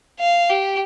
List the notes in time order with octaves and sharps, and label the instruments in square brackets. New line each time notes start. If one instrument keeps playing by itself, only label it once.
[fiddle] F5
G4